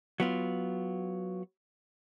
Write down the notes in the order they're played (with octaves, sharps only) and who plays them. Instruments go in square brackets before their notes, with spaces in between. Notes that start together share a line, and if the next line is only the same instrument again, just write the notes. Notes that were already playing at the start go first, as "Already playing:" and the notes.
[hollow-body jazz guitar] F#3 B3 F4